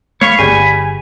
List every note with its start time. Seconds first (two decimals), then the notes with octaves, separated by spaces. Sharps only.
0.21 A3 C#5 F5 B5 C#6
0.39 G1 C#3 G3 G4 G#5